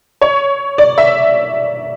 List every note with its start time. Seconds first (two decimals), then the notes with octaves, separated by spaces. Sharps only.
0.21 C#5
0.78 D5
0.98 E5